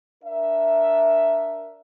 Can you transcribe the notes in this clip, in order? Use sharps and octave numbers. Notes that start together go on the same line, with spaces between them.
D4 A#4 E5